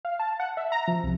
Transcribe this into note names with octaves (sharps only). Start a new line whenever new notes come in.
F5
A5
F#5
E5
A#5
F3
C2